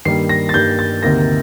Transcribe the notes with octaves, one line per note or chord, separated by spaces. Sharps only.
G2 D#3 G3 A#3 C7
A#6
A6
G2 D#3 G3 A#3 G6
A6
D2 C3 D#3 A#3 A#6